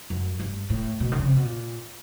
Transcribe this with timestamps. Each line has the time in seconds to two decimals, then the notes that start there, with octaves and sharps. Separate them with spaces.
0.10 F#2
0.40 G2
0.70 A2
1.00 B2
1.12 D3
1.19 C#3
1.28 C3
1.36 B2
1.44 A#2